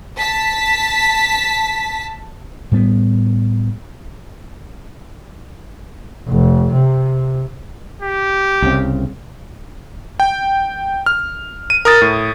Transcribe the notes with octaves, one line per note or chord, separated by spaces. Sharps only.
A5 B6
A2 G3 B3
F1
C3
G4
C2 C#3 C4
G5
F6
D#7
A#4 D#6 A6
A2